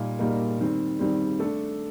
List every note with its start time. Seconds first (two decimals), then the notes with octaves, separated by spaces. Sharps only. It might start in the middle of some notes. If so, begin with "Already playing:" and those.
Already playing: A#2 G3 A#3 D#4 A#4
0.19 A#2 G3 A#3 D#4 A#4
0.59 D#3 G3 C4
0.99 D#3 G3 C4
1.39 A3 D4 A4